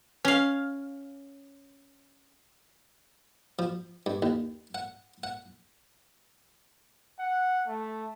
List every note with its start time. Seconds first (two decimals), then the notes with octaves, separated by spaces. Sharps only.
0.25 C#4 F5
3.59 F3
4.06 G2
4.22 D#2
4.75 F#5
5.24 F#5
7.19 F#5
7.68 A3